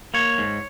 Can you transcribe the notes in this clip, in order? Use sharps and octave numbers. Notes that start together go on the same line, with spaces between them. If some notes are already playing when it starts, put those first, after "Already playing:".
A#3 C#5
G#2